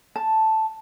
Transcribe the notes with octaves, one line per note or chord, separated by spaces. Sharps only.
A5